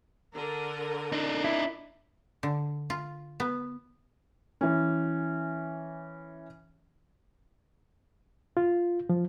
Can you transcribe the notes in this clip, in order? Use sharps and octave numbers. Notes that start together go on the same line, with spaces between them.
D3 A#4
D4 D#4
E4
D3
F4
B3
E3 C#4
F4
F3